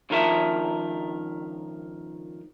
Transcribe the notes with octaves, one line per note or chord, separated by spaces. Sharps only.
C#2 D#3 F3 A#4 E5 A5